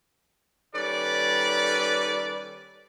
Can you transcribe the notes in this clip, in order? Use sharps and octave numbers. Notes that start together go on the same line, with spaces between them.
D#3 G3 C#4 A4 B4 D5